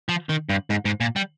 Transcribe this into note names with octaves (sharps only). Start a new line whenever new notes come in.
F3
D#3
G2
G#2
G#2
A#2
G3